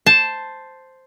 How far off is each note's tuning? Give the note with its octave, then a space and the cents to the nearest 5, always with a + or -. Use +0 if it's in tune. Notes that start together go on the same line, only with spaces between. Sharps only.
C5 +0 A5 +0